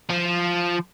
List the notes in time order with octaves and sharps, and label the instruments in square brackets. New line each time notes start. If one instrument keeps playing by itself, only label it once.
[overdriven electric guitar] F3